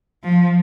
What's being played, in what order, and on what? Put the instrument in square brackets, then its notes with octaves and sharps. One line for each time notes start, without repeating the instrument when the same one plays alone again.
[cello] F3